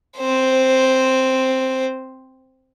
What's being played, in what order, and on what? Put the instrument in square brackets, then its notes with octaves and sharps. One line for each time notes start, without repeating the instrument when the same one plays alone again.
[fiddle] C4 C5